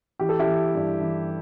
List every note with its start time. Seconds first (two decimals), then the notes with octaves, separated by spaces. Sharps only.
0.19 E3 G4
0.29 A4
0.39 E4 G4
0.47 E3
0.75 G2
1.01 E3